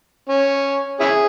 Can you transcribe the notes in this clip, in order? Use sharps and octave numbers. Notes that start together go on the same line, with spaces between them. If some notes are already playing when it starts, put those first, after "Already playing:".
C#4
C#4 E4 G#4